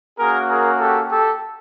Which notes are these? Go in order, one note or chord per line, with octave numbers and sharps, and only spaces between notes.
A#3 C#4 F#4 G#4 A#4
G#4 A#4
G4 A4
G4 A4